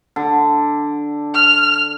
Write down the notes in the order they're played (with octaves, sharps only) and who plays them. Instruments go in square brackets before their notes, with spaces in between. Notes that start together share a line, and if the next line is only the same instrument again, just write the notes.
[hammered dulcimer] D3
[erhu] F6